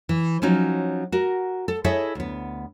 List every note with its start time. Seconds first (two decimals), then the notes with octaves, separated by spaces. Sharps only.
0.09 E3
0.42 F3 F#3 C#4 D#4
1.12 F#4 A#4
1.68 A4
1.84 E4 G#4 A4 C#5 D#5 E5
2.15 D2 B3